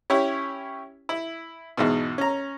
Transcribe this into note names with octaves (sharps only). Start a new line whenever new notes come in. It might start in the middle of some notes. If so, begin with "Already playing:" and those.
C#4 E4 G4 C#5
E4
E2 G#2 B2
C#4 A#5